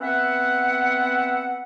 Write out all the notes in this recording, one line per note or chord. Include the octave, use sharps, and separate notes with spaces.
B3 C4 E5 F#5